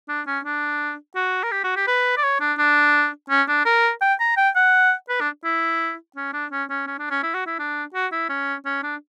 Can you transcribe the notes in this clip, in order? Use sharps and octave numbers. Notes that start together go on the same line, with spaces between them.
D4
C#4
D4
F#4
A#4
G4
F#4
G4
B4
D5
C#5
D4
D4
C#4
D4
A#4
G5
A#5
G5
F#5
B4
D4
E4
C#4
D4
C#4
C#4
C#4
D4
C#4
E4
F#4
E4
D4
F#4
E4
C#4
C#4
D4